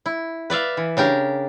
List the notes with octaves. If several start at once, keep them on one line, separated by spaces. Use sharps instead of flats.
E4
B4 D5 E5 F5
E3
C#3 D4 G4 A#4